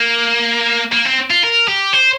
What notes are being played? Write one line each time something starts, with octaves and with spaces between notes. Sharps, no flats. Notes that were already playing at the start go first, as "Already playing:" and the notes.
Already playing: A#3
A#3
C4
F4
A#4
G4
C5